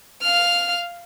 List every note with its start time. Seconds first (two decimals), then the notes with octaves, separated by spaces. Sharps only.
0.22 F5 F6